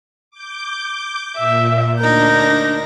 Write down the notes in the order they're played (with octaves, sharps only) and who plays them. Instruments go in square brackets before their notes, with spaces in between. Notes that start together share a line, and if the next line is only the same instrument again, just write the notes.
[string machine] D6 G6
[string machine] A#2 [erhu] E5
[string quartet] D2 D#4 A#4 [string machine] D4 A#6 [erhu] G6